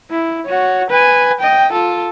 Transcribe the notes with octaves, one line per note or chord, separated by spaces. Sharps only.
E4
F#4 C#5
B4 G#5
D#5 G5
F4 A4